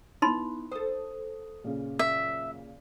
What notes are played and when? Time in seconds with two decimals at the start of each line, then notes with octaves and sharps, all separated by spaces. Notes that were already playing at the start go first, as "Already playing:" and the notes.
0.22 B3 D#4 E4 B5 C6
0.72 A4 C5 D#6
1.64 A#2 C#3
1.99 F#2 E5